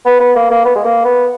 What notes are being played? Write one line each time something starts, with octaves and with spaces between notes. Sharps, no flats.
B3
B3
A#3
A#3
B3
G#3
A#3
B3